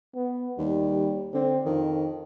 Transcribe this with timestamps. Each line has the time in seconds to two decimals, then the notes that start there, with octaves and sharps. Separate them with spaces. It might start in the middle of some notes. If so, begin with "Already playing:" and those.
0.15 B3
0.58 D#2 G3
1.34 D3 C4
1.66 F2 D#3